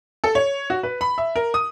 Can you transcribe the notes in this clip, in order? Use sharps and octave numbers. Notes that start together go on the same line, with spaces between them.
A4
C#5
F#4
B4
B5
E5
A#4
D#6